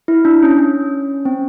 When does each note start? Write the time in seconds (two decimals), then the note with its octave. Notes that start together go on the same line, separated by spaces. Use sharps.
0.08 E4
0.25 D4
0.42 C#4
0.58 C#4
1.25 C4